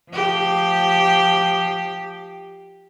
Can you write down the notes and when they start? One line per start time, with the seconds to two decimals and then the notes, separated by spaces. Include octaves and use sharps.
0.11 F3 G4